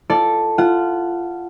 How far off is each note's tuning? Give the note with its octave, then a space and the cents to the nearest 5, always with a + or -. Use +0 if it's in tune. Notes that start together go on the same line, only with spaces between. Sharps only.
F4 -25 A4 +0 D5 -5
F4 -15 F#5 +0